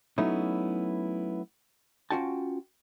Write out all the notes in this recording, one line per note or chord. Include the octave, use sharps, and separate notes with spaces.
F#3 A3 B3 C#4 D#4 E4
C#4 D4 F4 F#4 G5 A5